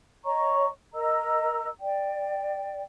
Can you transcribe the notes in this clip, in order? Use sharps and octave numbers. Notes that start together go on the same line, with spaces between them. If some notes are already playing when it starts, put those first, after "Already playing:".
C#5 D#5 A#5 C#6
A#4 D#5 A#5 E6
D5 G5